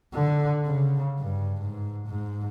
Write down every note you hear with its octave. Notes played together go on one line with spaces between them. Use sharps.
D3
C#3
G2
G#2
G#2